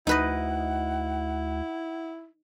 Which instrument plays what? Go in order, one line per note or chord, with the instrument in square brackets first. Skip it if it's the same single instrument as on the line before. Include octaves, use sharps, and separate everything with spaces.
[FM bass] D2 [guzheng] D#4 B4 D#5 [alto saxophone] E4 [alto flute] F#5